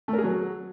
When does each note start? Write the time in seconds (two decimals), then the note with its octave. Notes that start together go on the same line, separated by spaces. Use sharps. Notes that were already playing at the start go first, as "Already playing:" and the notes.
0.08 A3
0.13 A#4
0.18 G#4
0.24 F#3